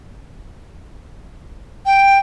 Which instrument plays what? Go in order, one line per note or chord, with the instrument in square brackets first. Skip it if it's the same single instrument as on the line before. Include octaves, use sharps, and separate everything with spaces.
[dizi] G5